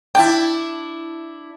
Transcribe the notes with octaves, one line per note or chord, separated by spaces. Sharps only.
D4 E4 G5